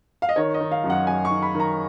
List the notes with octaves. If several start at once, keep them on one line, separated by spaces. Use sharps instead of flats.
F5
D#5
D#3 C#5
D#5
D#3
F5
F#2
F#5
F#2 G#5
C#6
D#3
B5
D#3
A#5